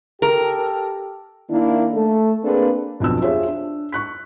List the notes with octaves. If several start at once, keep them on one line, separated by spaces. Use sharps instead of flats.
G4 A4 A#4
D#3 A#3 D4 E4
A3 A4
A#3 C4 D4 G#4 A4 B4
B1 F2 D4 E6
F4 G4 G#4 C5 C#5 E5
D4
C#6 F#6 B6